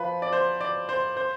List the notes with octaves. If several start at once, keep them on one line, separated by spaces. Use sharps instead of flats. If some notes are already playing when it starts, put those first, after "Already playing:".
Already playing: F3 B4
D5
C5
D5
C5
C5